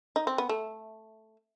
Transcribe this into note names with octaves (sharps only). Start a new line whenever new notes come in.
D#4
C4
B3
A3